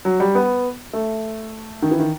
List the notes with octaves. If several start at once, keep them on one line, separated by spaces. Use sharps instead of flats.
F#3
G3
B3
A3
D#3
E3
D#3